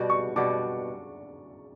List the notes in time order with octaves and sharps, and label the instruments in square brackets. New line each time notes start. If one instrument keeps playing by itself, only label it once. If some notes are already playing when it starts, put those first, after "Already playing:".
Already playing: [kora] B2 G3 D4 F#4 [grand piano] D5
[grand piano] C#6
[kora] B2 G3 D4 F#4 [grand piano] D6